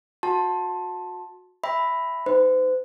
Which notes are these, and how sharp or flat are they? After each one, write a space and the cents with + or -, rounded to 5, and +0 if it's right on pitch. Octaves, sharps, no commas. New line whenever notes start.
F#4 -25 A5 +0 C6 +25
E5 -5 G5 +25 B5 +5
D#4 +0 C5 -40